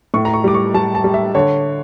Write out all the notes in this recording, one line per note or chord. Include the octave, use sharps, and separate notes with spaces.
A2 C#6
A#5
C#6
G3 D6
C#6
G3 A5
A5
G3
E5
D3 C#5